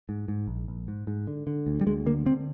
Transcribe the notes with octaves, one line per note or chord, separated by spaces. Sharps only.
G#2
G#2
A#1
A#1
G#2
G#2
D3
D3
D2
G3
D2 G#3
D3 A#3
D3 C4